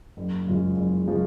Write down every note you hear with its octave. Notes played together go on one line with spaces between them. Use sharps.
F#1
F#2 C#3 F3 G#3
F#1
C#3 F3 G#3